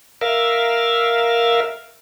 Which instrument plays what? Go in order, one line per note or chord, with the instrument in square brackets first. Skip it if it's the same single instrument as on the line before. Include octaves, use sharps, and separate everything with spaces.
[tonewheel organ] A#4 E5 F5